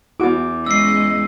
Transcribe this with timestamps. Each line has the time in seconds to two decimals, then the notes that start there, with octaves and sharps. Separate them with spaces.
0.20 E2 E4 F#4 D6
0.66 G#3 C#4 D#5 E6 C7